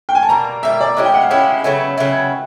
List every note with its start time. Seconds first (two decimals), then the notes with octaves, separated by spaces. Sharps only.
0.09 G5
0.15 G#5
0.23 A5
0.29 B2 G3 A#3 A#5
0.63 B2 G3 A#3 E5
0.81 D5
0.97 G#3 C#4 E4 G4 D#5
1.05 G5
1.14 F#5
1.22 F5
1.30 G#3 C#4 E4 G4 E5
1.64 C#3 F#3 B3 E4
1.98 C#3 F#3 B3 E4